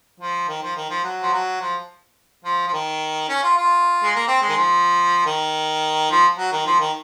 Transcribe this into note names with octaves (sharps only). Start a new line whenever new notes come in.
F3
D#3
F3
D#3
F3
F#3
F3
F#3
F3
F3
F3
D#3
C#4
F4
F4
G#3
A#3
C4
G#3
D#3
F3
D#3
F3
F#3
D#3
F3
D#3